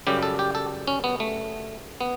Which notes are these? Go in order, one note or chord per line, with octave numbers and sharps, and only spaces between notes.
F#2 C#3 G3 G4
A4
G4
A4
C#4
B3
A3
B3